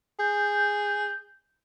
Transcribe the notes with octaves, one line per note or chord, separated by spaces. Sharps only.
G#4 G6